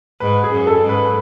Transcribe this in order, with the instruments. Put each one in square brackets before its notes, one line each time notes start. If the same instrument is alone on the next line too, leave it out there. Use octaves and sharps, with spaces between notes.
[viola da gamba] G#2 [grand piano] B4
[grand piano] G#4
[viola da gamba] F#2
[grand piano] A4
[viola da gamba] G#2
[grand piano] B4